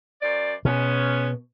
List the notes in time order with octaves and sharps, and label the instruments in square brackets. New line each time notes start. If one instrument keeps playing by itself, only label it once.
[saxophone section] F#2 C5 D5
[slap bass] B2 [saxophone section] G#3 B3 C#4